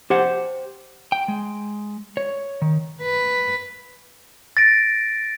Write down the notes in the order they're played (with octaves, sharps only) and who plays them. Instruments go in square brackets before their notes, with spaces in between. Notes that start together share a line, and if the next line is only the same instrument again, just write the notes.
[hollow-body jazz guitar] G4 C5 F#5
[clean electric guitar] G5
G#3
C#5
D#3
[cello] B4
[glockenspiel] A6 A#6 D7